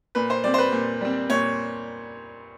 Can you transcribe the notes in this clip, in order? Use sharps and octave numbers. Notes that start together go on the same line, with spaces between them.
A#2 B4
C5
G3 C4 D5
C5
B4
A#2
G3 C4
A#2 C#5